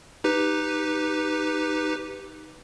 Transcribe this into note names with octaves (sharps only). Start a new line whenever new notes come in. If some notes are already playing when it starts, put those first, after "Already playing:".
D#4 G4 B4